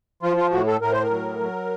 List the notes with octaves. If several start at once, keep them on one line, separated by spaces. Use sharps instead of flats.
F3 F4
F4
A2 F#4
A4
A2 A#4
C5
A#4
F#3
F#3